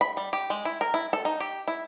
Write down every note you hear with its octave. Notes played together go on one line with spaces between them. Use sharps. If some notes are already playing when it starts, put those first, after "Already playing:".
B5
G3
G4
G#3
E4
A#4
E4
A4
D#4
G4
E4